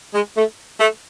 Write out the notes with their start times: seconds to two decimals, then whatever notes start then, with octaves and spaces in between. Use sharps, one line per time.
0.14 G#3
0.36 A3
0.80 A3